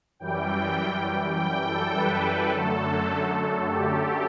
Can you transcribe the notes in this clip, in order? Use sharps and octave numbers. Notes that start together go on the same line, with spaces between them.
F#2 E3 G3 G5
G5
A4
B4
F#2 D3 F#3 A3 A4
G4